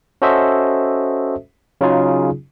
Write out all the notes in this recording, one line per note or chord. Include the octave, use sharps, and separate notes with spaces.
C#4 F#4 A4 C5 D#5 E5
C#3 F#3 C#4 D#4 F4 G#4